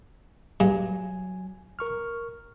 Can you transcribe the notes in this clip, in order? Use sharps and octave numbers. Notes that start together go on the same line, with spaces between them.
G2 F#3 G#5
A#4 C#6 F6